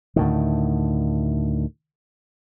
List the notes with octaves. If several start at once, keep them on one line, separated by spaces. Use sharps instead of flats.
D2 A2 D#3